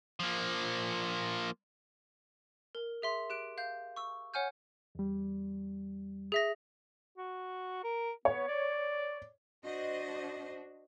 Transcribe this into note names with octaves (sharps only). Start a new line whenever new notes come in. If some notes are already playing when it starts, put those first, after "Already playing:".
F3 A#3
A#4
G#4 E5 C6
G4 F#6 D7
F5 G6
C#6 E6
C#5 F#5 G#5 F6 G6
E2 G3
G#4 E5 A#6
F#4
A#4
B3 C#5
D5
D4 F#4 C5 D#5